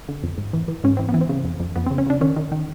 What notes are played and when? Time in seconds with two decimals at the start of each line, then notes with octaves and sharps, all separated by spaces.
0.08 D3
0.23 F2
0.38 G#2
0.53 E3
0.68 E3
0.84 G#2 C#4
0.97 E3 C4
1.09 B3
1.14 E3
1.21 C4
1.29 C#3
1.45 F2
1.60 F2
1.76 F2 B3
1.86 C#3 C4
1.98 C#4
2.07 C#3 D4
2.21 D#3 C#4
2.36 D#3
2.52 D#3